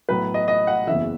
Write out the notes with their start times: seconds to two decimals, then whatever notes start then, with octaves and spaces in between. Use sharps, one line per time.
0.09 B1 A2 F#3 B4
0.34 D#5
0.48 D#5
0.67 F#5
0.87 F#1 E2 C#3 E3 E5